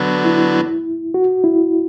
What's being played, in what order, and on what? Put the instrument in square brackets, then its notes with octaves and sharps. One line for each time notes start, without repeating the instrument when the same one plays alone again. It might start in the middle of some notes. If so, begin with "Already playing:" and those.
Already playing: [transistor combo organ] D3 F#3 B3
[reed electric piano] E4
F#4
E4